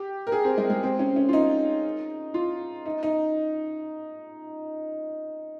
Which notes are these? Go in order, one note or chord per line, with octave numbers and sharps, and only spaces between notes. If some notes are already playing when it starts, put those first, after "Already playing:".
Already playing: G4
A#4
G#4
C4
G#3
G#3
C4
C#4
C#4
F4
D#4
F4
D#4
D#4